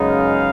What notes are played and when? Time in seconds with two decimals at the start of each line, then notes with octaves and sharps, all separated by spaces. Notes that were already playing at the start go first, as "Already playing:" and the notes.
Already playing: F#2 C#3 G#3 B3 D#4
0.09 F5